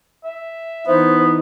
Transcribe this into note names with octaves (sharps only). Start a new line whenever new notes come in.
E5
E3 B3 D#4 C5